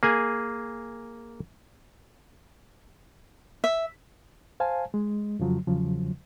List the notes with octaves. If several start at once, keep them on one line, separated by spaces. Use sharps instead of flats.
A#3 G#4 G#5
E5
C5 F5 G#5 A5
G#3
F2 C#3 F3 F#3
E2 C#3 F3 F#3